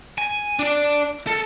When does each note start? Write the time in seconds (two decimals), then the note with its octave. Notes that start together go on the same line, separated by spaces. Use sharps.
0.18 G#5
0.59 D4 D5
1.27 A4